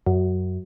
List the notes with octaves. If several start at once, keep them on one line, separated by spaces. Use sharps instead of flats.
F#2